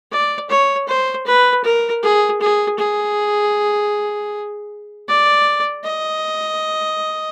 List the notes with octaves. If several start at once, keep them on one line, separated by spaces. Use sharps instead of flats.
D5
C#5
C5
B4
A#4
G#4
G#4
G#4
D5
D#5